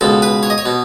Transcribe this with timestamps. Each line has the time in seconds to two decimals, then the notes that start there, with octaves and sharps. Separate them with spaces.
0.01 C#2 B2 A4
0.22 B4
0.43 C#5
0.50 D#5
0.58 C#5
0.66 B2